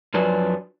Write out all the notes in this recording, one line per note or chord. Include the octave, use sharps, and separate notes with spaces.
F#2 F3 F#3 D4 B4 G#5